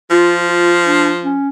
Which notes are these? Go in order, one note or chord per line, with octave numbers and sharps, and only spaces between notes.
F3 F4
F4
D4
C#4